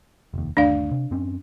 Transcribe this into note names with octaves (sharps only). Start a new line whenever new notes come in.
F1 D#2
G1 D#2 A3 D4 D5 F5
C3
F#2 C4 C#4